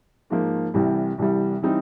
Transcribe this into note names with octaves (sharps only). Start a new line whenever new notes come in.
G#2 F3 A#3
C2 C3 E3 G3
C2 C3 E3 G3
E3 G3 C4 D#4